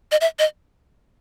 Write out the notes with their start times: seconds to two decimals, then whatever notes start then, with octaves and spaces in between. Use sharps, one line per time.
0.11 D#5
0.21 E5
0.39 D#5